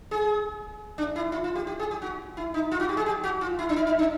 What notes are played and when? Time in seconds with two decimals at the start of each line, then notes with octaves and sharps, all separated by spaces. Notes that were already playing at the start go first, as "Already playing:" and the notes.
0.11 G#4
0.98 D4
1.16 E4
1.32 F4
1.44 F4
1.55 G4
1.67 G4
1.79 G#4
1.91 G4
2.02 F#4
2.37 E4
2.54 D#4
2.71 F4
2.80 F#4
2.89 G4
2.97 G#4
3.06 G4
3.24 F#4
3.41 F4
3.59 E4
3.69 D4
3.76 D#4
3.87 D#4
3.99 D4